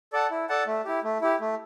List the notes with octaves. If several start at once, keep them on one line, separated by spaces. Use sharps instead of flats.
A4 D5 F#5 A5
E4
A4 D5 F#5 A5
A3
E4 G4
A3
E4 G4
A3